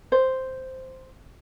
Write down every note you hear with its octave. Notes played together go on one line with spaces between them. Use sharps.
C5